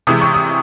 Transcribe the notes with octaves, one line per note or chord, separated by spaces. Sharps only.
C3 E3 G#3 D#6
C#6
D#6